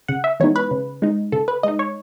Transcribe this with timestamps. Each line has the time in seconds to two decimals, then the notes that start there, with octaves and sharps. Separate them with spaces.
0.08 C#3 F#5
0.24 E5
0.40 E3 G#3 B3 D#4 C#5
0.56 B4
0.71 C#3
1.02 G#3 D#4
1.32 C#3 A4
1.48 B4
1.63 G#3 D#4 D#5
1.79 C#5